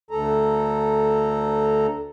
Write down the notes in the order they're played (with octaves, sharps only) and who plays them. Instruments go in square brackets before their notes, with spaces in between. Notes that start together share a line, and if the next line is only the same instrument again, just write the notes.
[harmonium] D2 A4 A#5